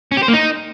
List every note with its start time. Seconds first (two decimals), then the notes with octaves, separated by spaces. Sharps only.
0.12 C#4
0.17 G4
0.23 C5
0.28 A#3
0.34 D#4